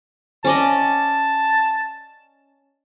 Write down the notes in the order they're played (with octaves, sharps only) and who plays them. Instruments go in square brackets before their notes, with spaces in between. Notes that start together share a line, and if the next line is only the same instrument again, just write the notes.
[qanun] C#4 D5 D#5 [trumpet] A5